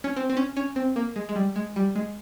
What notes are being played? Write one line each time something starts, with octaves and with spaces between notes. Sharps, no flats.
C#4
C4
C4
C#4
C#4
C4
A#3
G#3
G#3
G3
G#3
G3
G#3